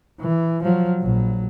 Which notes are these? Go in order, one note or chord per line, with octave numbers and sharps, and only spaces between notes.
E3
F3 F#3
A#1 F#3